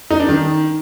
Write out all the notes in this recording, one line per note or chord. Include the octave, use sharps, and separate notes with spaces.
D#4
D4
D#3